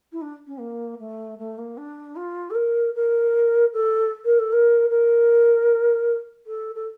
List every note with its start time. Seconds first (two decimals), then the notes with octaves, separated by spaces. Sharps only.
0.12 E4
0.21 D4
0.47 C#4
0.59 A#3
0.99 A3
1.38 A3
1.58 A#3
1.77 D4
2.16 F4
2.50 A4
2.55 A#4
2.95 A#4
3.73 A4
4.25 A#4
4.39 A4
4.52 A#4
4.89 A#4
6.46 A4
6.75 A4